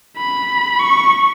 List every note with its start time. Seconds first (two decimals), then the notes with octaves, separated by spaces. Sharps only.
0.17 B5
0.79 C#6